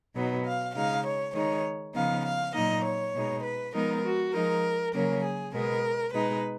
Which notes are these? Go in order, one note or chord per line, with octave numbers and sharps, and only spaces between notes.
B2 F#3 B3 D#4
F5
C#3 G#3 D#4 F5
C#5
D#3 G#3 D#4 C#5
C#3 F3 B3 D#4 F5
F5
A#2 F#3 A#3 D#4 D#5
C#5
B2 G#3 D#4
B4
F3 G#3 B3 D#4 A#4
F#4
F3 G#3 D#4 A#4
C#3 F#3 A#3 C#4 A#4
G#4
B2 G#3 B3 A#4
B2 G#3 D#4 B4